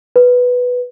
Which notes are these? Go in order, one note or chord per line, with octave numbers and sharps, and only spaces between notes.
B4